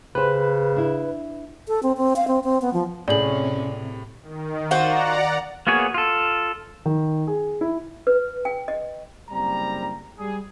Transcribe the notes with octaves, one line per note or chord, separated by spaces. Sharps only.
C#3 G4 B4 C5
D4 E4
A4
C4
C4
F5
C4
C4
B3
F3
A2 C3 C#4 G#4 D5 F#7
D#3
F4 F#4 C5 D5 F#5 A#5
A#3 B3 F#4 G#4 C#5
F4 A4
D#3
G#4
E4
B4
G5
D#5
F#1 G3 C4 A#5
G3 G#4